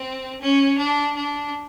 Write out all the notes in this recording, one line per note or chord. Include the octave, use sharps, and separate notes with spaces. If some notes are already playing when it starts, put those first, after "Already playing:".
Already playing: C4
C#4
D4
D4